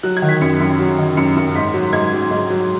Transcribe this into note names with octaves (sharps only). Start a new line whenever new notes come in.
F#3 F#6
G#6
D#3
B6
F#2 C#7
F#2
F#3
D#3
F#2 C#7
F#2
G#2 B6
F#3
G#2 G#6
F#3
G#2
F#3